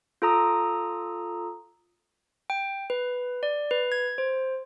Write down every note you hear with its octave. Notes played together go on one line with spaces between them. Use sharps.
F4 A4 A#5 D#6
G5
B4
D5
B4
G#6
C5